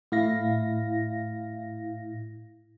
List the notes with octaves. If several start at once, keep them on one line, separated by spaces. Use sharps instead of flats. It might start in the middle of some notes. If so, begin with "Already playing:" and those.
A2 E4 F5 A#6